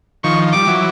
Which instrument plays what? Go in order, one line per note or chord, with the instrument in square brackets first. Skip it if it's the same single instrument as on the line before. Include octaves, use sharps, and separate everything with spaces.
[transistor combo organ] D#3 F3 [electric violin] C#6
[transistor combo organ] G3 [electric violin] D6
[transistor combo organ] E3 F#3